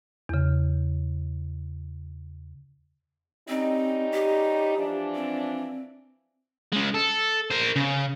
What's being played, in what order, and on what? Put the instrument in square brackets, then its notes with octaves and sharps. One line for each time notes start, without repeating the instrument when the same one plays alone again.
[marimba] E2 C#3
[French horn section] G3 C#4 D#4 [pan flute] C4
[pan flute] G4
[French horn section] E3 F3 D4
[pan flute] C4
[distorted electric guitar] C#3 G#3
A4
A#4 C5
C#3